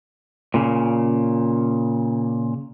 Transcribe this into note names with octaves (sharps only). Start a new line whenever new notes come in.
A#2 C#3